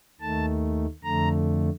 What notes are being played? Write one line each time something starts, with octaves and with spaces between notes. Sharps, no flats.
D#2 D#3 A3 A5
F2 D3 A3 A#5